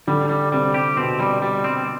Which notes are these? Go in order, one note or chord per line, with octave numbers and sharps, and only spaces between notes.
D3 G3
G3
C3 G3
G4
B2 C4
G3
G3
C4